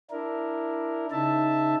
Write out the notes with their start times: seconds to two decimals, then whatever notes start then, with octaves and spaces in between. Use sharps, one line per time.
0.11 D4 E4 A#4
1.11 C#3 D#4 E5 A5